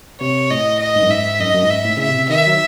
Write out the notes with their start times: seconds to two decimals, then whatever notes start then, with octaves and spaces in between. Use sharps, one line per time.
0.21 C3 C#5
0.50 A2 D#5
0.80 D#5
0.96 G#2
1.02 F#2
1.09 G#2 E5
1.39 F#2 D#5
1.53 F#2
1.62 G#2
1.70 E5
1.84 A2
1.97 C#3 E5
2.07 C3
2.29 D#3 E5
2.47 F#3